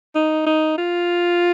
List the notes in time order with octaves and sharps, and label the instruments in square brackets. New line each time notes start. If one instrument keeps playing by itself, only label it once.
[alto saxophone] D#4
D#4
F4